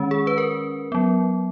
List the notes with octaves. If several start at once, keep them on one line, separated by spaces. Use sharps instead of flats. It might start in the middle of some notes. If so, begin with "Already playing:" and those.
Already playing: D#3 G#3 C#4
G#4
B4
A#4
F#3 B3